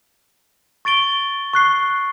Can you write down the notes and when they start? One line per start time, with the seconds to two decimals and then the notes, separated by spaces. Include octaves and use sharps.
0.85 C#6 A6 D7 G7
1.53 C#6 F#6 C7